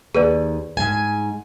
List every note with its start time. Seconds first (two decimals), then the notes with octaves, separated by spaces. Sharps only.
0.15 D#2 G#4 B4 D5
0.77 G#2 G#5